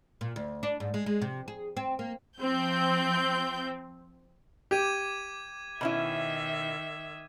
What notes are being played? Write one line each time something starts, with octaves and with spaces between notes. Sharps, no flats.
A#2
D2
D4
G#2
G#3
G#3
C3
G#4
C4
A#3
F3 C4 G6
G4 D6 G#6 D#7
B2 D#3 C#4 E4 E5